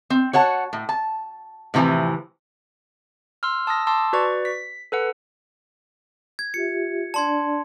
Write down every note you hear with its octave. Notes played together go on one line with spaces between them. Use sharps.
C4
F#4 C#5 F#5 A5
A2
A5
A2 C3 E3 F3 G#5
C6 E6 F6
A5 D#6 E6 A#6
A5 C6 D6 E6
F#4 B4 D5 C#6
B6
A4 B4 F#5
G#6
F4 G4 E5 C#7
D4 D5 A5 C6 G#6